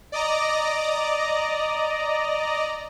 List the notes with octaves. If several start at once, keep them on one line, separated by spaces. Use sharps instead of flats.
D5 D#5 A#5